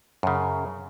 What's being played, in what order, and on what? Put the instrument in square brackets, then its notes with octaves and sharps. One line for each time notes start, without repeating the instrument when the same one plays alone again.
[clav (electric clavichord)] F#2 C#3